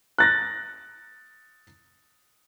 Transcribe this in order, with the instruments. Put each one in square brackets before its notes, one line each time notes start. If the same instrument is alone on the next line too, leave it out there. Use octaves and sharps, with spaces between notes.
[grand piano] F#6 A6 A#6